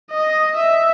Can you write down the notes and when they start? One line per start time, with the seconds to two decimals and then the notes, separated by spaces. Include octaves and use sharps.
0.11 D#5
0.56 E5